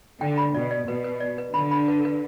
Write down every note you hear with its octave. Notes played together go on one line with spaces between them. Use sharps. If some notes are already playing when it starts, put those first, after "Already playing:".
D3 G5
B5
B2 D5
D5
B2 B4
B4
D5
B4
D3 B5
B5
B4
B4